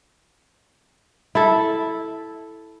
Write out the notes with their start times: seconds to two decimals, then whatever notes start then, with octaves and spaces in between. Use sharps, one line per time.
1.35 E4 A4